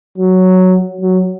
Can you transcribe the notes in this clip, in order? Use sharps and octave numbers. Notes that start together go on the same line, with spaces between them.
F#3
F#3